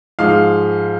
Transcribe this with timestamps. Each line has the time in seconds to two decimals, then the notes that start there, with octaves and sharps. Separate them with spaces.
0.19 G#2 F3 G#3 F5